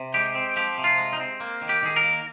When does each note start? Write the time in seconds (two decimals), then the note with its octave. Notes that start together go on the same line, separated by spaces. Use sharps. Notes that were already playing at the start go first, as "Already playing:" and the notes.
Already playing: C3
0.14 G#3 G4
0.35 C4
0.56 F3 G4
0.78 C3
0.84 F4
0.98 G#3
1.13 D#4
1.20 C4
1.40 A#3
1.62 D#3
1.69 G4
1.83 D#3 G#4
1.96 A#4
2.03 A#3